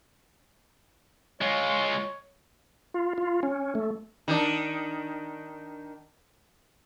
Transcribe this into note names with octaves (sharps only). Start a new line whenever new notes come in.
G#3 F4 C#5
F4
F4
C#4
A3
D#3 D4